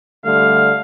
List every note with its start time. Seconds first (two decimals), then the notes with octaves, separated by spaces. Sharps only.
0.25 D3 G3 A3 F5